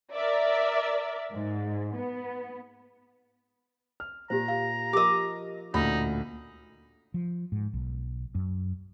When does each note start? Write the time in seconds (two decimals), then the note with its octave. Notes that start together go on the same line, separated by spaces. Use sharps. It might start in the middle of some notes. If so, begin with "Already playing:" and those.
0.12 A#4 D5 E5
1.33 G#2
1.95 B3
4.00 F6
4.30 A#2 G4 C5 A#5
4.48 F5
4.93 F3 G4 A#4 D#5 D6
5.74 A1 D2 A#2 D#4 B5
7.14 F3
7.52 G#2
7.73 B1
8.35 F#2